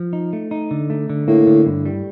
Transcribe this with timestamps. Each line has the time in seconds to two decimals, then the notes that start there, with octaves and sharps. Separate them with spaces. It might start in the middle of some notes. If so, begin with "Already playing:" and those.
Already playing: F3
0.13 D#4
0.33 A3
0.51 D#4
0.71 D3
0.90 A3
1.10 D3
1.28 A2 A#3
1.47 D3
1.66 G2
1.86 G3